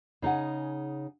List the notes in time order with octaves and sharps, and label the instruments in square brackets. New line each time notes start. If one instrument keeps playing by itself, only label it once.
[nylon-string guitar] C#3 D#4 G#4 F#5